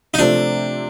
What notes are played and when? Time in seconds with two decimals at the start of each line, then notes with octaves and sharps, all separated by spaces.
0.14 D#4
0.19 C3 F3 A3 C4 D4